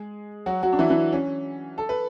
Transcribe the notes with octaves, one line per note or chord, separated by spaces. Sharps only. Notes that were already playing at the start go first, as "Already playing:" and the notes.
Already playing: G#3 G#4
F#3 F#4
F#3 F#4
D4
E3 E4
E3 E4
C#4
A4
B4